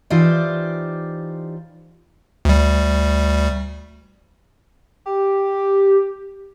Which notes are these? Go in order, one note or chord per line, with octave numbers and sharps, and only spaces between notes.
E3 D#4 F4 G4 C5 D5
D2 G3
G4